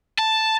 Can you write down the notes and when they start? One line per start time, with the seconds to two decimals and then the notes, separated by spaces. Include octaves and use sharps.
0.18 A5